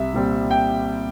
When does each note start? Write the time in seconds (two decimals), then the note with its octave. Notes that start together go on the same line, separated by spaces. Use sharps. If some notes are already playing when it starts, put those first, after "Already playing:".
Already playing: C2 E5
0.13 A#2 G3 C4
0.51 G5